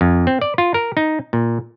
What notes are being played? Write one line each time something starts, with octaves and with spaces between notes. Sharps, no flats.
F2
C4
D5
F4
A#4
D#4
A#2